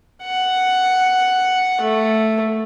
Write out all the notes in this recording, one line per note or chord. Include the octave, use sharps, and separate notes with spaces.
F#5
A3